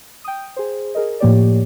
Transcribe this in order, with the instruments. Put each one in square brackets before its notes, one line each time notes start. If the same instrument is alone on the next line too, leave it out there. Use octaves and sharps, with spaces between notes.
[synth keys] G5 D#6
G#4 C5
G#4 A#4 D#5
A2 F3 A#3 G4 C#5 D5